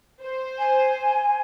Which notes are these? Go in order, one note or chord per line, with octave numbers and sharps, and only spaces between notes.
C5
G#5